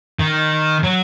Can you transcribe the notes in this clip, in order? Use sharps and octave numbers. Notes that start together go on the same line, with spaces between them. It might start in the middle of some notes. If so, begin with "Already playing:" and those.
D#3
F#3